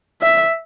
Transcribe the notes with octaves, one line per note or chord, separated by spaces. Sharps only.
E5